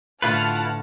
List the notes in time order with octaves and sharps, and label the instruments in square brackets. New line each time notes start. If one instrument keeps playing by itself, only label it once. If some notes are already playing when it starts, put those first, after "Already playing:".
[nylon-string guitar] A2 D3 [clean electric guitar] E4 F4 B4 [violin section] F#5 A5 F6